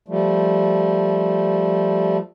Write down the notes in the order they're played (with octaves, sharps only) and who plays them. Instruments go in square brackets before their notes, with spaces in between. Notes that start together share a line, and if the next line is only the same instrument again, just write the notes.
[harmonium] F3 G3 A3